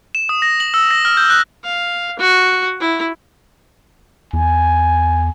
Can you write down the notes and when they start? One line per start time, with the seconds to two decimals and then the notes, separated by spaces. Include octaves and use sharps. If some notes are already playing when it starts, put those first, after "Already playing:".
0.15 E7
0.29 D#6
0.42 A#6
0.60 F#7
0.74 E6
0.91 A#6
1.05 F6
1.17 G6
1.30 F#6
1.64 F5
2.19 F#4
2.80 E4
4.33 E2 G#5